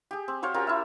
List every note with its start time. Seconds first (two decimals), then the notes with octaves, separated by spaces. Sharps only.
0.11 G4 G#4
0.28 C4
0.43 F#4 C5 C#5 F5
0.54 C#4 F4 G4 A#4
0.67 E4 E5